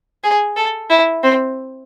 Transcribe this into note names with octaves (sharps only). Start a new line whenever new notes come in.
G#4
A4
E4
C4